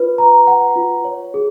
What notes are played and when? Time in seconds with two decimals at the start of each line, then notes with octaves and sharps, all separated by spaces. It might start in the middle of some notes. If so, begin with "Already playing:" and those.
Already playing: F4 B4
0.18 A#5
0.47 F#5
0.76 F4
1.05 C#5
1.34 G#4